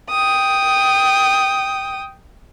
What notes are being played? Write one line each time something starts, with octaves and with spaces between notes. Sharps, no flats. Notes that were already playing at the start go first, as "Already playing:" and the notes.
G5 D#6